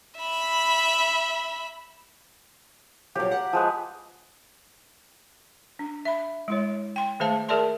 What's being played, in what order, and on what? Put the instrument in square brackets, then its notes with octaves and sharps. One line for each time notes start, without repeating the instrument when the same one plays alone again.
[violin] E5 B5
[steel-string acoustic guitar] F3 F#3 [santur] G4 A#5
[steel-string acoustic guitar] F#5
[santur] F3 G#3 B4
[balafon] D4
E5 B5
G#3 E4 C#5
G5 C6
D#3 A3 G#4 C5 F5 A5
G#4 A#4 D5 E5 A5 C6